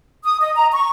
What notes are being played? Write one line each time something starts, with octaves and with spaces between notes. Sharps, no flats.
D#6
D#5
A#5
C#6